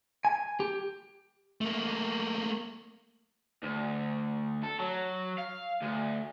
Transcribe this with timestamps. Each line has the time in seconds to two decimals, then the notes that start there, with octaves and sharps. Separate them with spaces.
0.25 G#5
0.60 G4
1.61 A3 A#3
3.63 D2
4.63 A4
4.79 F#3
5.38 F5
5.82 D2